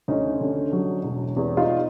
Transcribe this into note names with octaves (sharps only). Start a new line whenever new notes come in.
D2 C#4 D#4
D3
F#3
E1
E2
D#4 F4